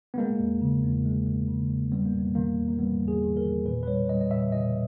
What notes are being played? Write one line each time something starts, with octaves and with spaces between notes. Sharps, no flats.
B3
G#3 A#3
E2
C#3
E2
G#3
E2
C#3
E2
G3 B3
A#3
E2 B3
D#3 A#3
E2
A#3
G3 B3
E2
G#4
D#3
A#4
E2
A#2 B4
B4
G3 C#5
G3 D#5
D#5
A#2 E5
A#2 D#5